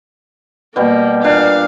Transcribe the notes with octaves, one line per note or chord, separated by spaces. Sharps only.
B2 G3 A#3
A#2 D4 F5